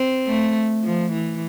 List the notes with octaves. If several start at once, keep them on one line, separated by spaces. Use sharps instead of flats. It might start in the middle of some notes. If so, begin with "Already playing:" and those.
Already playing: C4
A3
F3
E3